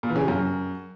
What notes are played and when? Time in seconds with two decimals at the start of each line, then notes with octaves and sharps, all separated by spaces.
0.03 A#2
0.09 E3
0.16 C#3
0.22 C3
0.28 F#2